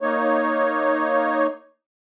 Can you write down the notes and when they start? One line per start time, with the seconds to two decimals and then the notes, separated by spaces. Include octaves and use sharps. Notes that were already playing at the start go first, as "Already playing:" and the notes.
0.01 A#3 D#4 C#5